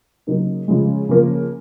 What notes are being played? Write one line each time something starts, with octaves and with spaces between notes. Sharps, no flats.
C#3 F#3 A#3 D#4
C#3 F3 G#3
C#3 F3 A#3